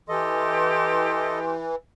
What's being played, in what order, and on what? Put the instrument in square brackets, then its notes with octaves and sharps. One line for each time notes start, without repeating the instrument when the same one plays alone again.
[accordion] E3 [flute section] G4 C6 [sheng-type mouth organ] A4 D#5